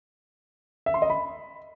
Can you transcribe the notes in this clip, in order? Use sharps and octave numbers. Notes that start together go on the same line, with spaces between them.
E5
C6
D#5
B5